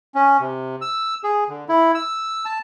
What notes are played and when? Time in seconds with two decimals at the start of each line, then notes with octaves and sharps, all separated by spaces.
0.15 C#4
0.40 C3
0.81 E6
1.24 G#4
1.49 D3
1.69 E4
1.95 E6
2.45 A5